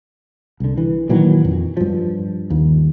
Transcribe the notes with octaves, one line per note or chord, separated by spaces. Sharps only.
C2 D3
E3
A#2 D#3 E3 F#3
F2
G2 F3
D#2